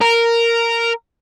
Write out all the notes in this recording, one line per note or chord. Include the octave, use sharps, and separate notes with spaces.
A#4